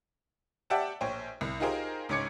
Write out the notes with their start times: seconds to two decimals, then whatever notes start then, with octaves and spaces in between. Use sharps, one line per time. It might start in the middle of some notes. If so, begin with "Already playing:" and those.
0.70 G4 D5 E5 F#5 G5 A5
1.01 A#1 C5 C#5 G5
1.41 C2
1.60 D#4 F4 G4 G#4 A#4 C5
2.09 C#2 G#2 C#5 D6 G#6 C#7